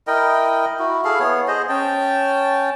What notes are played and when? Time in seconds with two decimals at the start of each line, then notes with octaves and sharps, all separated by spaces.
0.07 E4 A#4 D#5 G5
0.79 E4 F#4
1.05 E4 G#4 A4 F5
1.20 B3 C#5
1.48 G#4 C5 D#5
1.69 C#4 G5 A5